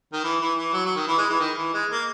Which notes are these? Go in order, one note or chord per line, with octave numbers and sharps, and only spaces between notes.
D#3
E3
E3
E3
F#3
F#3
D#3
E3
G#3
E3
D#3
E3
G#3
A#3